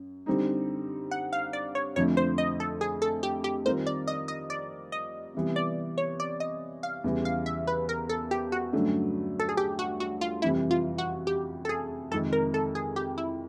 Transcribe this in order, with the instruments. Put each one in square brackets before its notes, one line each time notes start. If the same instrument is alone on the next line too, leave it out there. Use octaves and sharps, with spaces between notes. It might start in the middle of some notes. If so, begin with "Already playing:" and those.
Already playing: [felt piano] F#2
D3 G3 C4 D#4
[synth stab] F#5
F5
D5
C#5
[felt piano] F2 D3 F3 A3 [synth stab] C#5
[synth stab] C5
D#5
A4
G#4
A4
G4
G4
[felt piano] D#3 G3 C4 F4 A#4 [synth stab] C5
[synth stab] D5
D#5
D#5
D5
D#5
[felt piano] C3 E3 G3 B3
[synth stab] D5
C#5
D5
D#5
F5
[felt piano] E2 C#3 E3 G3
[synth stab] F5
E5
B4
A#4
A4
G4
F#4
[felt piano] G2 D3 F#3 A3 C#4
[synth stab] A4
G#4
G4
F#4
F#4
F4
[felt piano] F2 C3 E3 G3 [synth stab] E4
[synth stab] F4
F#4
G4
A4
G#4
[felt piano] F2 C3 D#3 G#3 [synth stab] A4
[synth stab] A#4
A4
G#4
G4
E4